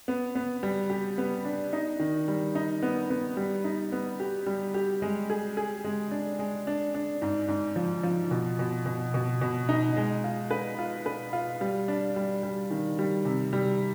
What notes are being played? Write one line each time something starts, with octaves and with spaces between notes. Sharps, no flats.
B3
B3
G3
G4
B3
D4
D#4
D#3
G3
D#4
B3
B3
G3
D#4
B3
G4
G3
G4
G#3
G#4
G#4
G#3
D4
G#3
D4
D4
G#2
G#2
F3
F3
B2
B2
B2
B2
B2
D#4
G#3
F4
B4
F4
B4
F4
G3
D4
G3
G3
D#3
G3
C3
G3